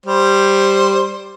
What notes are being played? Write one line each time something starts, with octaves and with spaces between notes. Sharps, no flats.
G3 C5